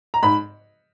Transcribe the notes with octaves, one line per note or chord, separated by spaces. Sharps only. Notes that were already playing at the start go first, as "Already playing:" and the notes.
A#5
G#2 B5